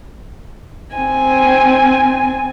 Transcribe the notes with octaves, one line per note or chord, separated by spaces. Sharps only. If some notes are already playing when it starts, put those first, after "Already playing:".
C4 G#5